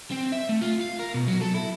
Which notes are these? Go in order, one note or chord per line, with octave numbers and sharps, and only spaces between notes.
C4
E5
A3
F4
F5
A#4
B2
F#3
A4
E4